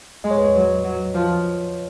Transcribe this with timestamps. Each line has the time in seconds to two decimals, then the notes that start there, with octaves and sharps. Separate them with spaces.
0.24 G#3 D#5
0.31 C#5
0.38 B4
0.45 C#5
0.55 F#3
0.84 F#3
1.14 F3